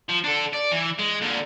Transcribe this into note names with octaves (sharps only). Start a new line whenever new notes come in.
F3
D4 A4
D5
E3
G#3
A#2 D3